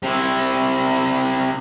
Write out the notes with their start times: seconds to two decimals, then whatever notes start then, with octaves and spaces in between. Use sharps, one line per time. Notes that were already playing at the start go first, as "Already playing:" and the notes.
0.03 C3 E4